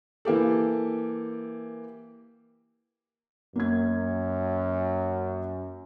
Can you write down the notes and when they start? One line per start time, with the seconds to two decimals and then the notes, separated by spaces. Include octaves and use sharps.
0.25 E3 A#3 G4 A4
3.56 F#2 A#3 G#6